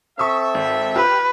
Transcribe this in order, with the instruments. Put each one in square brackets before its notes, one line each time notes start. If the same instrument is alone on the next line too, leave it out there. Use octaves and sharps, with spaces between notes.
[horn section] C4 A4 E5 [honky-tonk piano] C#6 D#6 E6
[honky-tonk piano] G#1
[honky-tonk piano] F4 G4 [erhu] B4